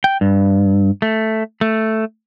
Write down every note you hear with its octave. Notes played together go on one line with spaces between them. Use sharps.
G5
G2
A3
A3